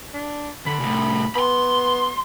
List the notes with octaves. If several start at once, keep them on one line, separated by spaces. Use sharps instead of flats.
D4
D3 B5
C2 A2
B3 B5 C6